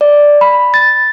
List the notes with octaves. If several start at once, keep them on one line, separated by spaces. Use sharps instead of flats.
D5
B5
A6